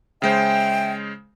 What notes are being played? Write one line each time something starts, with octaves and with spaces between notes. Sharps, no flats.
C#3 G#3 C5 E5 G5